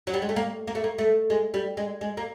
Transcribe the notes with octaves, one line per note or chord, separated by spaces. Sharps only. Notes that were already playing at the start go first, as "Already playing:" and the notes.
F#3
G3
G#3
A3
A#3
A#3
A3
A#3
A3
G#3
G3
G#3
G#3
A#3